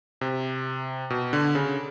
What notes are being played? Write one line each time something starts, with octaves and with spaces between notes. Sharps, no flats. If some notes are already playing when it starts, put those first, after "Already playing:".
C3
B2
D3
C#3